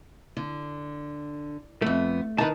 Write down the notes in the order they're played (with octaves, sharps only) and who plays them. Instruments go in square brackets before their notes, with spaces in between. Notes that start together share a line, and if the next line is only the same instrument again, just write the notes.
[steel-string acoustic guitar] D3
[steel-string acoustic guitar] F2 B3 [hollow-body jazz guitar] A3
[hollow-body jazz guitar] D#3 A5 [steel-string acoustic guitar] D#4 B4